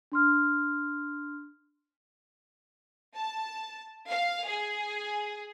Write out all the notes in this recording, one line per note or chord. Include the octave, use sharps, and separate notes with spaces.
D4 C6 F6
A5
F5
G#4